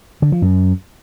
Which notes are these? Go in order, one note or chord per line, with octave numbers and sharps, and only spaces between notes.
D3
F3
F#2